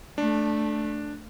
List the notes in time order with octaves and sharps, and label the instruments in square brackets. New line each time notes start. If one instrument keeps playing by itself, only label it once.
[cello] A3 [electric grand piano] D4